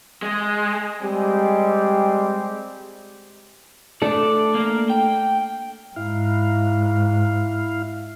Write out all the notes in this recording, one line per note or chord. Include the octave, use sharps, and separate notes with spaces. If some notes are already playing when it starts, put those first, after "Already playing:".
G#3
G3 G#3 C4 G4
A3 D4 A4 D5
A#3
G5
G#2 E4 F5